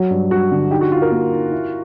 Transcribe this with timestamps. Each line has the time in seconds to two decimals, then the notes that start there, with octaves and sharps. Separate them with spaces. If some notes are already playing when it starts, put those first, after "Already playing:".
Already playing: F#3
0.10 G2
0.30 G2 F#4
0.51 D3
0.71 D#4 G4
0.81 F#4
0.91 D#4 F4
1.02 A#4
1.11 A#3
1.32 D#4
1.52 E4